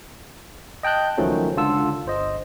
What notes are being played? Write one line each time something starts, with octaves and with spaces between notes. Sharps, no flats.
D#5 G5 A5 F#6 G6
C#2 D#3 F3 F#3 A3 C#4
C#2 D3 F4 A4 E6
G1 C5 D#5